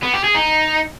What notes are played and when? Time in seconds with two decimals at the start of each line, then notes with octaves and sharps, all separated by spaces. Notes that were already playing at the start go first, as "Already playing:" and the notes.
0.03 B3
0.14 G4
0.24 G#4
0.35 D#4